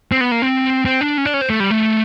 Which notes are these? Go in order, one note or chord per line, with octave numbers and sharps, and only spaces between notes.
C4
B3
A#3
C4
C4
D4
C#4
D4
C#4
C4
A3
G3
A3